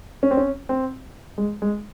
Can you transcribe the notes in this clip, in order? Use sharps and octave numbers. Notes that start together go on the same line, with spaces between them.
C#4
C4
C#4
C4
G#3
G#3